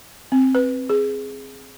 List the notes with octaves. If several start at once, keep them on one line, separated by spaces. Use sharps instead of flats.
C4
B4
G#4